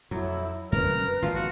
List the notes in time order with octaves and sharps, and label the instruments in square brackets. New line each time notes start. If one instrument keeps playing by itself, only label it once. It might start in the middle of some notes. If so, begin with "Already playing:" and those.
[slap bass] F2 [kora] F#3 [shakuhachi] E4
[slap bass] F#2 D3 C#4 [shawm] A#4 [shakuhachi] B4
[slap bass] G#1 D#2 B2 [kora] F3 F4 [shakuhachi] F5
[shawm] F#4